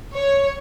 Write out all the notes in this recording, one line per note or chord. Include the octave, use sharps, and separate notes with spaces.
C#5